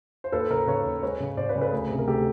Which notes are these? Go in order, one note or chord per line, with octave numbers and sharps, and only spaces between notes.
C5
D#2 A4 B4
C#3 A#4 C5
C#3 B4 C#5
D#2
G#3 B4 C#5
C#3
C#3 C5 D5
B4 C#5
C#3
A4 B4
D2 G#4 A#4
C3
A#4
D2 G4 A4